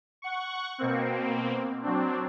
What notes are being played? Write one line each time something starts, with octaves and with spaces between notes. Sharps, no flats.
F#5 C#6
B2 A#3 C4
F#3 C4 D4